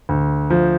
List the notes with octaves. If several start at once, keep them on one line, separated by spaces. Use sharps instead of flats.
D2
F3